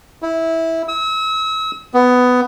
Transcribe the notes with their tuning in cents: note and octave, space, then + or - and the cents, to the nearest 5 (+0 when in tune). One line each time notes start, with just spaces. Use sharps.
E4 -15
E6 -40
B3 +15